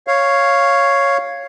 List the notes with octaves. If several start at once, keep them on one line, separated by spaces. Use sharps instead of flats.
C#5 F5